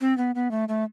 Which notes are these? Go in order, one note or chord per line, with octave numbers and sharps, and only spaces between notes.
C4
B3
B3
A3
A3